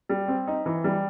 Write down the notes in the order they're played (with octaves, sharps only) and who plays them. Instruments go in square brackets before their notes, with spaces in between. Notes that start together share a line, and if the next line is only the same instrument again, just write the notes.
[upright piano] G3
C4
D#4
E3
G3